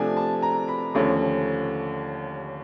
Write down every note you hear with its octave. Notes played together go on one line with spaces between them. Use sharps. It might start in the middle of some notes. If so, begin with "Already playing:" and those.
Already playing: C3 F3 A3 D4 G#5
A5
A#5
B5
D#2 D3 F3 A3 C#4